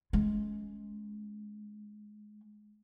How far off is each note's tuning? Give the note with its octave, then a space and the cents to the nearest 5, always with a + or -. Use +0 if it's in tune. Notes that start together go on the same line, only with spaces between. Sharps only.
G#3 +15 C#4 +0